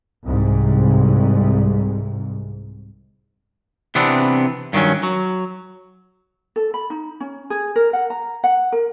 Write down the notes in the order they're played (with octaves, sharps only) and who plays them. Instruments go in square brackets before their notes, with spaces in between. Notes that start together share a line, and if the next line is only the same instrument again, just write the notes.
[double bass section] C2 G#2
[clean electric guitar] C3 E3 B3 C4 D4
G2 D#3 F#3 C#4
F#3
[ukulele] A4
B5
D#4
C#4
G#4
A#4
F#5
A#5
F#5
A#4